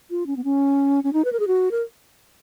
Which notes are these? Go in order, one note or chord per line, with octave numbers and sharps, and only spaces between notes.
F4
C#4
B3
C#4
C#4
D#4
B4
A#4
G#4
F#4
A#4